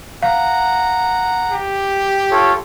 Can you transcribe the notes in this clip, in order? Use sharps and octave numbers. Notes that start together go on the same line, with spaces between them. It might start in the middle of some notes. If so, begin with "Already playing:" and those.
F5 F#5 A#5
G4
F4 A4 C#5